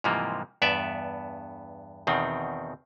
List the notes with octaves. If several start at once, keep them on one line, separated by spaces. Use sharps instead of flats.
G#2 C3 E3 F3 G3 A#3
E2 G2 B3 D5 E5
E2 B2 D#3 C4